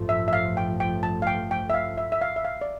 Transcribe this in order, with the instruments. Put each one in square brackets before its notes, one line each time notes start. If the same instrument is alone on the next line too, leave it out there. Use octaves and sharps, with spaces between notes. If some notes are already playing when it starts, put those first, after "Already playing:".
Already playing: [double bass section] A1 G2 F3 A3
[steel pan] E5
E5
F5
G5
G5
A5
F5
G5
G5
E5
F5
E5
E5
F5
E5
F5
D5